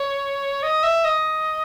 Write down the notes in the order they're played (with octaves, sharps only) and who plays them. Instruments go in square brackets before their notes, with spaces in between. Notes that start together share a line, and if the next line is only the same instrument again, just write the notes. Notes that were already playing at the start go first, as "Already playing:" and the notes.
Already playing: [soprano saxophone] C#5
D#5
E5
D#5